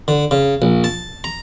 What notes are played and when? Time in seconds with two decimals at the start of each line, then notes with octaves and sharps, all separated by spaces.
0.08 D3
0.31 C#3
0.62 A#1
0.84 A5
1.24 A#5